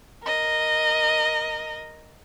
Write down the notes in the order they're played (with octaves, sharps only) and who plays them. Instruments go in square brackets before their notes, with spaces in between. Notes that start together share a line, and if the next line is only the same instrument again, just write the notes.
[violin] A#4 D#5